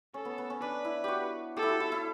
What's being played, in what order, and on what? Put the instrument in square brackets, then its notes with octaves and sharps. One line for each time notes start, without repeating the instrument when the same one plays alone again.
[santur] C#4 [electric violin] A4
[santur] B3
B3
C#4
[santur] D4 [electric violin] B4
[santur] E4
F#4 G4
[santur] G4 [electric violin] A4
[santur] E4
F#4
E4
E4